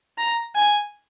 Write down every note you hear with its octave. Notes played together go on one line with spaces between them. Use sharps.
A#5
G#5